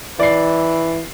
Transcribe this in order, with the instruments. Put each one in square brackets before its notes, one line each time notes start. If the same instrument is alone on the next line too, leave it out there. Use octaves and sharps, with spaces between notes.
[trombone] E3 [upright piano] D5 C7